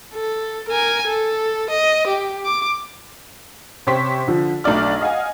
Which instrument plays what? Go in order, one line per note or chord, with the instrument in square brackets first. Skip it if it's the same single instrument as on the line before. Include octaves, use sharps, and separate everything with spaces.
[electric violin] A4
A#4 G#5
A4
D#5
G4
D6
[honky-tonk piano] C3 C#4 G4 C5 C#6 B6
D3 F3
B1 A3 D4 D5 F6
D#5 F5 F#5 G#5